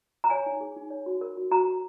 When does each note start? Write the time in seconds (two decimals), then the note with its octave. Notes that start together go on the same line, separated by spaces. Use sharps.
0.24 A#5
0.30 C#5 G#5
0.46 D#4
0.61 G#4
0.76 D#4
0.90 C#5
1.06 F#4
1.21 A#4
1.37 F#4
1.51 F#4 A#5
1.67 F#4